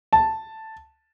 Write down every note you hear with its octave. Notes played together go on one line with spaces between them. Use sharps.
A5